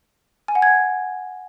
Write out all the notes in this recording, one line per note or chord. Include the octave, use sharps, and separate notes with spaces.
G#5
F#5
G#6